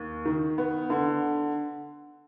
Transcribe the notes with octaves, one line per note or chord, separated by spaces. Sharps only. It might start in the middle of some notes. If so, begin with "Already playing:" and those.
Already playing: D#2
D#3
B3
D3